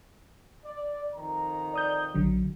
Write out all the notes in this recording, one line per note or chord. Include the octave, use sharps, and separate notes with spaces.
D5
F2 D#3 A#5
D5 D#6 G6
A#1 D3 F#3